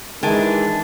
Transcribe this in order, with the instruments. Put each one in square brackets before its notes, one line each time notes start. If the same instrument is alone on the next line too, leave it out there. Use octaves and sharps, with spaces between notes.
[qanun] D#3 [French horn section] E3 [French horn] G#3 [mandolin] D4 G#5